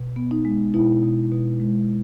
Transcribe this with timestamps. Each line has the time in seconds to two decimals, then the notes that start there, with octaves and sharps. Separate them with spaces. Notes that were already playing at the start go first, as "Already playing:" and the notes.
Already playing: B2
0.16 B3
0.31 D#4
0.45 G#3
0.74 B2 E4
1.03 B2
1.32 B2
1.60 G#3